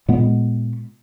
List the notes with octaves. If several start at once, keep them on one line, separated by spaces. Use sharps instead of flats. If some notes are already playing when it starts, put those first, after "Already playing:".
A#2 G#3 B3